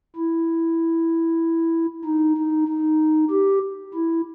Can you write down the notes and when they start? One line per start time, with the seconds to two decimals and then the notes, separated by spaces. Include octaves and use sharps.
0.16 E4
2.05 D#4
2.37 D#4
2.68 D#4
3.31 G4
3.94 E4